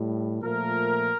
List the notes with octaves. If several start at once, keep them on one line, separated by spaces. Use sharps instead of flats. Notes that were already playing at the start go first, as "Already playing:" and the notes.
Already playing: A2 G3
A#2 F3 A3 A#4